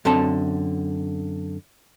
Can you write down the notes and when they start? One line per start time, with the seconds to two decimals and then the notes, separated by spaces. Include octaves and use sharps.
0.05 F#2 D3 C4 A4 A5